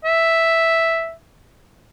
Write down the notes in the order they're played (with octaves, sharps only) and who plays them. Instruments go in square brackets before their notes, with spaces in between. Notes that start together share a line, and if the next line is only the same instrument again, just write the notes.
[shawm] E5